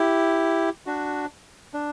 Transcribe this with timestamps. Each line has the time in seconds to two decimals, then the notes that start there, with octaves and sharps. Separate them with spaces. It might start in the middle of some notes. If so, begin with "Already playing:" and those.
Already playing: E4 G4
0.86 D4 F#4
1.74 D4